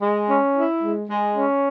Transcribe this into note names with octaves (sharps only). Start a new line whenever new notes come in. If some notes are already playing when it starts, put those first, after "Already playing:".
G#3
C#4
E4
G#3
G#3
C#4